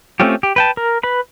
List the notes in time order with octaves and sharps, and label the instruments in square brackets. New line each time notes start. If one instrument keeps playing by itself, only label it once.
[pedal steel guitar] A3 C4 C#4 F4 G4
G4
B4 G5 A5
A#4
B4 B5